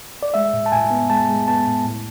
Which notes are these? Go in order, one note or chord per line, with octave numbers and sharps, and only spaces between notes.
D5
G#3 E5
A2
A5
A2 G#5
B3
G#3 A5
G#3
B3 A5
A2
A2